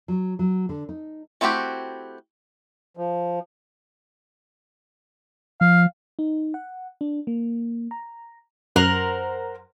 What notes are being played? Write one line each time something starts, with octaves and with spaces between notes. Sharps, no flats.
F#3
F#3
D3
D#4
A3 C4 E4 F#4 G4
F3
F3 F5
D#4
F#5
D4
A#3
A#5
F#2 A#4 C5 F#5